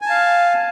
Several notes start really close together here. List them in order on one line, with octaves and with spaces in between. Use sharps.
G#5 A5 F5